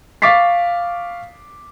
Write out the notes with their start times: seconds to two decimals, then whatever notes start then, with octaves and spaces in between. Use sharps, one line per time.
0.22 F5 C#6 D6 A6 B6 C7